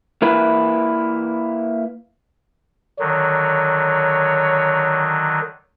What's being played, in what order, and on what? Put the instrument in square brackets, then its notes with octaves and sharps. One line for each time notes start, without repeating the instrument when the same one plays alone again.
[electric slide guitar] A#3 E4 B4
[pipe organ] D3 D#3 F#3 [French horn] C#5